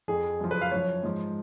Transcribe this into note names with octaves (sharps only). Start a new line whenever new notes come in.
F2 F3 G#4
F#2 C#3 F3
B4
F5
F#2 F3 C#5
G#2 F3